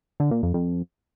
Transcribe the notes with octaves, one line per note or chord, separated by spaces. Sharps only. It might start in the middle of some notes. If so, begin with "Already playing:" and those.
D3
A#2
F2
F2